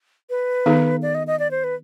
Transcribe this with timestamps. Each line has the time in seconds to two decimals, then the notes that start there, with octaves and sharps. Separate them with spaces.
0.30 B4
0.66 D#3 B3 D#4 G#4
1.02 D5
1.15 D#5
1.27 D#5
1.39 D5
1.51 C5
1.64 B4